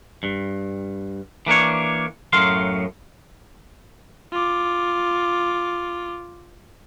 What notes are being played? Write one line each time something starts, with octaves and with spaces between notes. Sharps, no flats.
G2
E3 A#3 D4 C#5
F#2 A2 F#3 F5 C6
F4 D6